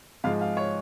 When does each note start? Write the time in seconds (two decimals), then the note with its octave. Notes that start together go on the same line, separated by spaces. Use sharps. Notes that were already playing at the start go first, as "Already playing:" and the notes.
0.24 G#2 F3 G#3 F5
0.41 F5
0.57 C#5